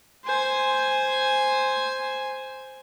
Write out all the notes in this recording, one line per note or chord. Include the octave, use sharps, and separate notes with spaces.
C5 G#5